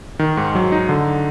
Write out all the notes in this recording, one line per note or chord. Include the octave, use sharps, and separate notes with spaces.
D#3
G#2
F#3
D#4
D3